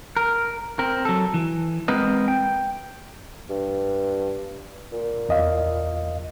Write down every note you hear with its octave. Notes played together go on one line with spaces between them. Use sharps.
A#4
C4 A#4
F#3 A4
E3
G#3 B3 C4 A#4 B4 D#5
G5
G2
A#2
E2 D#5 F5